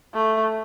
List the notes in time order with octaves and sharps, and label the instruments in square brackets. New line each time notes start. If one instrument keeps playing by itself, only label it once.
[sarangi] A3